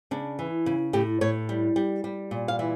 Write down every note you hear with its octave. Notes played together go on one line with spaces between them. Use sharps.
C#3 D4
E3
C#3
A2 G4
A2 C#5
G3
G3
G3
A#2
F5
E3 E5